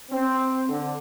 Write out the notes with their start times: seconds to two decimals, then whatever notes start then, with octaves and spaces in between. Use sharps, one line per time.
0.10 C4
0.69 D3